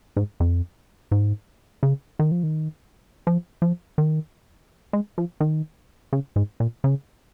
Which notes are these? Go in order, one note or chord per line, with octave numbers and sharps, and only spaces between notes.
G#2
F2
G#2
C#3
D#3
F3
D#3
F3
F3
D#3
G#3
F3
D#3
C#3
G#2
A#2
C#3